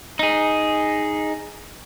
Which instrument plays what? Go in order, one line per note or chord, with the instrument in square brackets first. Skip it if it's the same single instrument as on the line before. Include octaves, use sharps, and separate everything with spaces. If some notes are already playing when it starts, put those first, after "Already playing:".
[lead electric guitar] D#4 G#4